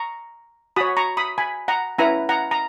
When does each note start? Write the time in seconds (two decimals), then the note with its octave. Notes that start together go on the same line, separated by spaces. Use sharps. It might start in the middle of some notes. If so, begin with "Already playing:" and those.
Already playing: A#5 C#6
0.76 F#4 C#5 B5 D#6
0.97 A#5 C#6
1.17 B5 D#6
1.38 G#5 B5
1.68 F#5 A#5
1.98 C#4 E4 B4 F#5 A#5
2.29 F#5 A#5
2.51 A#5